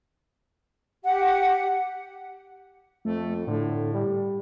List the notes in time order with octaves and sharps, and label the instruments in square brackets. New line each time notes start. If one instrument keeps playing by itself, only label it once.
[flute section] G4 F#5
[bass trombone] F2 [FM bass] A3
[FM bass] A2 [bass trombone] D3
[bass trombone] G3